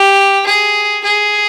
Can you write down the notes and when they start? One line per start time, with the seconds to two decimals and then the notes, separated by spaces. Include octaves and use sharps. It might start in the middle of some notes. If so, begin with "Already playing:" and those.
Already playing: G4
0.46 G#4
1.04 G#4